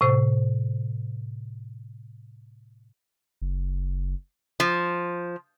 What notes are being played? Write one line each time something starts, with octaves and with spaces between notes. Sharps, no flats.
A2 C3 C5
F#1
F3